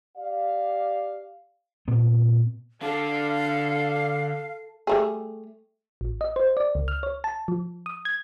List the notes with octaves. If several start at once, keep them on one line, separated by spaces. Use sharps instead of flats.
G4 D5 F5
A#2 B3 C4
D3 D4 A4 F5
G3 A3 G#4
A1
D#5
C5
D5
C#2
F6
C#5
A5
F3
D#6
G#6